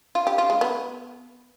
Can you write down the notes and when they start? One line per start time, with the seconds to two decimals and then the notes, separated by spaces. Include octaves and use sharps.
0.15 F4
0.27 G4
0.38 F4
0.50 G#3
0.61 B3